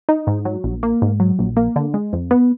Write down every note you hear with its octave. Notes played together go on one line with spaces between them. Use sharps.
D#4
G#2
F#3
A#1
A#3
G#2
F#3
A#1
A#3
D3
G#3
F2
B3